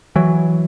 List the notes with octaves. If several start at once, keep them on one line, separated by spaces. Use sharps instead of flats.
E3 F#3